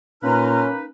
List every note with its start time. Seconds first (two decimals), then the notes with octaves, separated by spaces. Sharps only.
0.23 A#2 A#3 C#4 D#4 B4 A#5 C6 F6